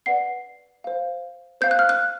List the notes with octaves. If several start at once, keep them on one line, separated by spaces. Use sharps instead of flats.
B4 D5 F#5 C7
C5 F5
C5 F5 G6
F#6
F6
F#6